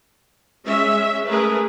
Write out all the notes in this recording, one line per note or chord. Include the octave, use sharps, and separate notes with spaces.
G#3 C#4 E5
A3 G#4 A#4 B4